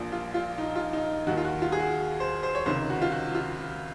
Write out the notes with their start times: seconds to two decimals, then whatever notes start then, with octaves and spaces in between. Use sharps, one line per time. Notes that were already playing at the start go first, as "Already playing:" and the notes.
Already playing: A#1 A#2 F3
0.12 F4
0.34 F4
0.58 D#4
0.76 F4
0.93 D#4
1.27 D#2 D#3 F#4
1.37 F4
1.45 F#4
1.62 F4
1.72 G#4
1.80 F#4
2.20 C5
2.43 C5
2.55 C#5
2.66 C#2 C3 D#3 C5
2.90 F#4
3.01 F4
3.12 F#4
3.35 F4